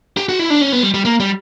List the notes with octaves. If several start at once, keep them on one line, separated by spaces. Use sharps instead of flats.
G4
F#4
E4
D4
C#4
B3
G3
G3
A#3
G3